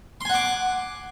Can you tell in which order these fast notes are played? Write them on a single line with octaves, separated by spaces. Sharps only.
C6 G#5 F#5 D6